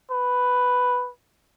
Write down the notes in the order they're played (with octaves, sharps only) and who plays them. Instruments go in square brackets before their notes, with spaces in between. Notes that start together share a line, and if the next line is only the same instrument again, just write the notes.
[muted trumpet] B4